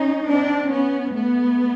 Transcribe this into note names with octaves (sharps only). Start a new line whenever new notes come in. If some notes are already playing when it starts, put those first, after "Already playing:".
Already playing: C#4 D#4
C4 D4
B3 C#4
A3 B3